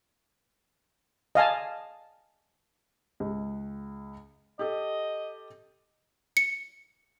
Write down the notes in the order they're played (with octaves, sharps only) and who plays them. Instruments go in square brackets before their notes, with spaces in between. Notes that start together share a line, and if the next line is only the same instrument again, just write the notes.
[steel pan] D#5 F5 G#5 A5
[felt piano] C#2
[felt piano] G4 A4 [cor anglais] D#5
[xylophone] C#7